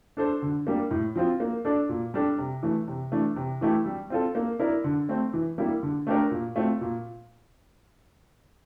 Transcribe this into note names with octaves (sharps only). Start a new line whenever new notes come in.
D4 A4 C5
D3
G3 A#3 D4
A2
F3 C4 F4
A#3
D4 A4 D5
A#2
G3 D4 A4
C3
E3 A3
C3
E3 A3 D4
C3
E3 A3 E4 G4
G3
C4 F4 A4
A#3
E4 A#4 D5
D3
A3 C4
E3
G3 A#3 E4
D3
A3 D4 G4 A#4
A#2
A3 C4 F4
A#2